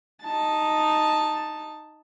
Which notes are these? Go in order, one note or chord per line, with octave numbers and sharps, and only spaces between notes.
D#4 A5